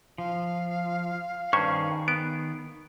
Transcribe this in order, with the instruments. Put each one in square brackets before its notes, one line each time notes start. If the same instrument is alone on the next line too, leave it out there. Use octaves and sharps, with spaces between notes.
[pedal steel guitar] F3 [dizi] F5
[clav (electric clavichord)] G2 C#4 C5 [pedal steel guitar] D#3 G#4 F6 [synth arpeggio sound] C#6
[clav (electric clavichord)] B3 [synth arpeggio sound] D7